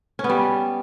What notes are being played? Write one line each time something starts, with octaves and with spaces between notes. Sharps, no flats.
C#4
B3
G3